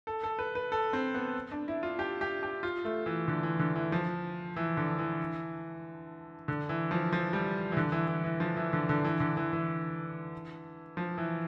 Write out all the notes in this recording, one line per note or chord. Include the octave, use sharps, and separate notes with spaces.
A4
A4
B4
B4
A4
C4
B3
D4
E4
F4
G4
G4
G4
F4
A3
E3
D3
E3
D3
E3
F3
E3
D3
E3
D3
E3
F3
F3
G3
E3
D3
E3
E3
E3
F3
E3
D3
D3
E3
D3
E3
E3
F3
E3